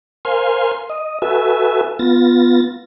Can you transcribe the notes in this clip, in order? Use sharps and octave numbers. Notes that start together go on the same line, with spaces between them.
A#4 C5 F5 G#5 C6
D#5
F#4 A4 B4 E5 G#5
B3 F4 A6 A#6